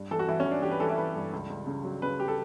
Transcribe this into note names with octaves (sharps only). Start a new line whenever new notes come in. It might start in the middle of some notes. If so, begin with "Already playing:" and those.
Already playing: G2
E3 A4
F#4
E3 E4
C#4
E3
D4
E3 G4
B4
E3 A4
E4
E3 B4
G2
C#2
C#2
C#3
F#3
C#3 B4
G4
A4